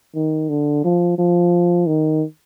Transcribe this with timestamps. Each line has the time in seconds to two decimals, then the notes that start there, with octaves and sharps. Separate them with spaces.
0.15 D#3
0.49 D3
0.84 F3
1.18 F3
1.87 D#3